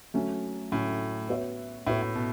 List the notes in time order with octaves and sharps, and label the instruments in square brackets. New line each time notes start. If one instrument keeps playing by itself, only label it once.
[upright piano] F#3 A3 C#4
[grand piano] A2 [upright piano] F#3 A3 C#4
[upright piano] B3 F#4 C#5 E5
[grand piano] A2 [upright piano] B3 F#4 C#5 E5
[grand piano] A2
B2